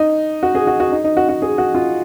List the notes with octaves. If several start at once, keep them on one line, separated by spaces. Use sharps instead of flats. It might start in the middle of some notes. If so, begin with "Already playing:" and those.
Already playing: D#4
F#4
G#4
F#4
F#4
D#4
D#4
F#4
F#4
G#4
F#4
F4